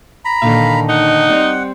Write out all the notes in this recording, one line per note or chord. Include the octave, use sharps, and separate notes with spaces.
A#5 B5
A#2 D3 D#3 F5
D#4 F#5
G3 C4 D5